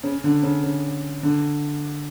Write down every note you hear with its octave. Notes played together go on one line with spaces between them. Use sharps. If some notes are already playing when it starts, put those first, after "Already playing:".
C#3
D3
C#3
C#3
D3